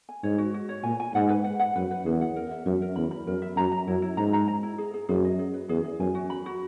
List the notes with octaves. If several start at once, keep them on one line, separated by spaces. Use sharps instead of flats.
G#5
G#2 C#5
F#4
F#4
C#5
A#2 G#5
G#5
G#2 F#5
B4
F#5
F#5
F#2 B4
B4
E2 G#4
F#5
A#4
E5
F#2 E5
A#4
E2 B5
B5
F#2 A#4
E5
F#2 A#5
A#5
F#2 E4
E4
G#2 A#5
A#5
A#5
E4
G#4
G#4
F#2 G#4
D#5
G#4
B4
E2 G#4
G#4
F#2 G#5
F#4
B5
F#4